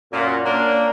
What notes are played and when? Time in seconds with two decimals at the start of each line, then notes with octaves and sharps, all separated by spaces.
0.13 F#2 A#2
0.45 A#3 C#4 D4